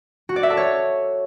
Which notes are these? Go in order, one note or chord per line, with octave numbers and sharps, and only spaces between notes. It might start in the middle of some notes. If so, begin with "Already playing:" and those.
F#4
D5
E5
A4
C#5